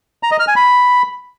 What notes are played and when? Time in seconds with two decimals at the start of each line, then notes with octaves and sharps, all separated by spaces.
0.23 A#5
0.31 D#5
0.40 F6
0.48 G#5
0.56 B5